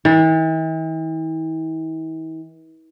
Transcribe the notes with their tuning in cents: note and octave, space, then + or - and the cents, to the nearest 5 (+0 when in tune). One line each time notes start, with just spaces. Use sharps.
E3 -45